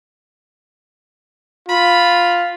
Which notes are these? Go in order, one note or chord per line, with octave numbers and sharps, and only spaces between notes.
F4 B5